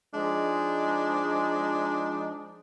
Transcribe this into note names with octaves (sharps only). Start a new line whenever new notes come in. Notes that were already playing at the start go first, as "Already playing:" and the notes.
F3 G#3 D4 D#4